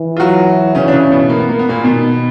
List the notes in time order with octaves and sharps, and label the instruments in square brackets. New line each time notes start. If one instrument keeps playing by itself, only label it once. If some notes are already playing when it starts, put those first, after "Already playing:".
Already playing: [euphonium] E3
[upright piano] F4
F#3 F#4
C#3 C#4
D4
C#3 C#4
B2 B3
A#3
B3
A#3
B3
A#2 A#3
[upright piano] B2 B3 [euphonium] D#3